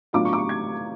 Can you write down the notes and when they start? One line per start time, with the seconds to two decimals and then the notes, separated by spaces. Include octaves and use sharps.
0.13 A2 F#3 B3 D4 F4 D6
0.25 C#6
0.33 D6
0.38 C#6
0.49 G#6